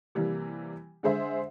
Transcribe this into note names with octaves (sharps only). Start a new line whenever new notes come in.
C3 E3 G3 A#3
D3 G#3 G#4 C5 E5